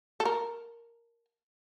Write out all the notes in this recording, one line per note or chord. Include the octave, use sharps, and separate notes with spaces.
A4
A#4